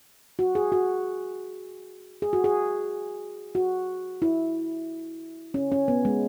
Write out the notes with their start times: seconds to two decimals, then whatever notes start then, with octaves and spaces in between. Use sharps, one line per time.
0.39 F#4
0.55 G#4
0.72 F#4
2.22 G#4
2.33 F#4
2.44 G#4
3.55 F#4
4.22 E4
5.54 C#4
5.72 C#4
5.88 B3
6.05 G#3